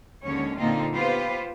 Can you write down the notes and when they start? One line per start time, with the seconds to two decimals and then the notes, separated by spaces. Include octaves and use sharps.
0.24 D#2 D3 G#3 C#4 C#5
0.57 A#2 D3 A#3 C4 D#4 F4
0.95 B3 F4 G4 B4 C5